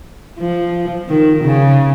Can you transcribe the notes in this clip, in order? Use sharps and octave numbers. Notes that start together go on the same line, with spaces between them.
F3
D#3
C#3